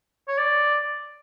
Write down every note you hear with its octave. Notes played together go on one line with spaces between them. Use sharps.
C#5
D5